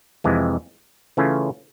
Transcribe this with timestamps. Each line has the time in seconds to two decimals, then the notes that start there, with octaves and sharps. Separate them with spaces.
0.24 F2 C3 E3 G#3
1.17 C#3 E3 A3 C#4 F4